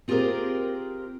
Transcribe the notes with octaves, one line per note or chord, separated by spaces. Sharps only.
C4 F4 G4 G#4 A#4 C5